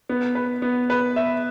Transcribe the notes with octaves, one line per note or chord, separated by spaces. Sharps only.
B3
B4
B3
B4
E5